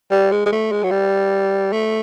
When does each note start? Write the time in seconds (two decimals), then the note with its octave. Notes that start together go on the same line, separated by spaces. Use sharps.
0.11 G3
0.32 G#3
0.46 G#3
0.52 A3
0.72 G#3
0.84 F#3
0.91 G3
1.73 A3